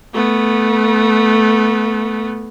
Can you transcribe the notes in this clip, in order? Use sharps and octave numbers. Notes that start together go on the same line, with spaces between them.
A3 B3